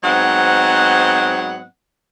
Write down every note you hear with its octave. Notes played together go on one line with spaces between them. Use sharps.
G#2 F#3 B3 C4 D#5 F#5